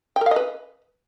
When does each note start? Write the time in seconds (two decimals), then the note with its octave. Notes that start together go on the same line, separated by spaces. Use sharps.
0.16 G5
0.21 A#4
0.26 F5
0.31 D#5
0.36 B4